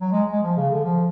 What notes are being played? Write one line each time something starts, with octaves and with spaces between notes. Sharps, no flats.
F#3
G#3
G#3
F3
C#3
D3
F3